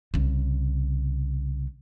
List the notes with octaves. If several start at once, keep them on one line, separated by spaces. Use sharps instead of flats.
C2 C#3